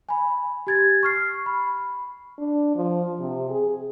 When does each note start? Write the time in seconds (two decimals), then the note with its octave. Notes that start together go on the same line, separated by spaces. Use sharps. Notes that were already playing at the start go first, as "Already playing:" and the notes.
0.09 G#5 B5
0.67 G4 G#6 A6
1.03 C#6 F6 C7
1.46 B5
2.38 D4
2.75 F3
3.19 C3
3.50 G#4